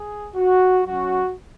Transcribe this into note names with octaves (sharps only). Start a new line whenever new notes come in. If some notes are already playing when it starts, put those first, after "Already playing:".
Already playing: G#4
F#4
F#3 C#4 F#4